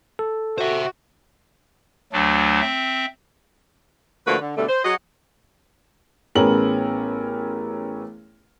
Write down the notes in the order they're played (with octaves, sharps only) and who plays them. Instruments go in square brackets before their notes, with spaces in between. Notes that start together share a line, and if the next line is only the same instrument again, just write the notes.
[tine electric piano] A4
[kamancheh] F#4 [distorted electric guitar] C5 E5
[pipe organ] D2 F#3 A3 D4
C4 E5
[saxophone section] D3 F3 A3 A#3 F#4 B4
D3
B2 D3 G3 A3
C5
F#3 F#4 G#4 D#5 F#5
[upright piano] A1 B3 C#4 G#4 A#4 F#7